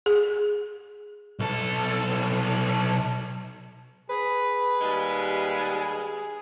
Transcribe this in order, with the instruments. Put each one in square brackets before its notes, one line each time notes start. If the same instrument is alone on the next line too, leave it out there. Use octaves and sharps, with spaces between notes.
[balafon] G#4
[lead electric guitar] B1 A4
[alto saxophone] G#4 [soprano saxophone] B4
[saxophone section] D#2 G3 G#3